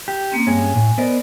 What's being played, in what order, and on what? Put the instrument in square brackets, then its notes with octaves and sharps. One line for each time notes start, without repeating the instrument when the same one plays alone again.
[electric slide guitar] G4
[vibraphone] A#3 C4 C#4
[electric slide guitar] G2 G#3 C#4 [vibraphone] G#5
[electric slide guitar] A2
[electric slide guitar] B3 A#4 D#5 [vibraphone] C5 D5